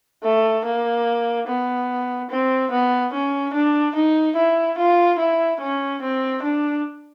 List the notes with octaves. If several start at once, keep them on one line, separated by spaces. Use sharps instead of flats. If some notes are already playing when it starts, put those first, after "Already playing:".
A3
A#3
B3
C4
B3
C#4
D4
D#4
E4
F4
E4
C#4
C4
D4